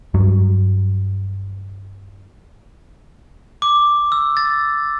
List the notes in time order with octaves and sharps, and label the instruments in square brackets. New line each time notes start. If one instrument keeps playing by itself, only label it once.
[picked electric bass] G2 F#3
[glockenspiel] D6
E6
A6